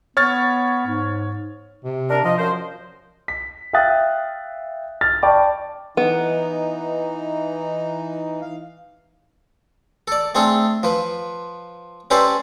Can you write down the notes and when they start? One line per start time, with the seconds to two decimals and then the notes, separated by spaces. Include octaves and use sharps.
0.17 B3 C#5 F6 A6
0.87 G#2
1.84 C3
2.10 D4 A#4
2.24 F3 F4 D#5
2.38 F#2 C5
3.28 B6
3.73 E5 F5 G5 D#6 F#6 A6
5.01 F6 A6
5.23 D5 G5 A5 B5 C#6 D6
5.97 E3 B3 D#4
8.41 F5
10.08 A4 D5
10.35 A3 C4 D4 G#4 A4
10.83 F3 B4
12.11 C#4 G4 A4 B4 C5 D5